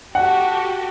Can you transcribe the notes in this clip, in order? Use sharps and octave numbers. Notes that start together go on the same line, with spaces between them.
F#4 G4 A4 F#5